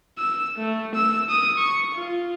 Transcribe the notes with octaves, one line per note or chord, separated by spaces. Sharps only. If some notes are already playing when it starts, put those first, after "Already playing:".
E6
A3
E6
D#6
C#6
F4